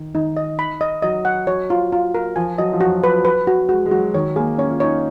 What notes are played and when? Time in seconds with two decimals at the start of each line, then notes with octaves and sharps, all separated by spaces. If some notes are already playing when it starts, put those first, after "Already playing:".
Already playing: D#3
0.14 D#3 D#4
0.37 D#5
0.59 B5
0.81 D#5
1.02 F#3 D#5
1.25 F#5
1.47 F#3 C#5
1.70 F4
1.92 F4
2.15 A#4
2.36 F3 G#5
2.58 F#3 D#5
2.73 F3
2.81 F#4
2.86 F#3
3.04 B4
3.25 B4
3.47 F#4
3.69 G#3 F#4
3.86 G#3
3.91 F#3 F#4
4.14 D#3 C#5
4.36 A#3 G#4
4.58 C#4 C#5
4.70 F4
4.80 D#4 C#5